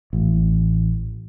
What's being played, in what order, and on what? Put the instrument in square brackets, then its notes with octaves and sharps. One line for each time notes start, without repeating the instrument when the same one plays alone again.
[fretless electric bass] A1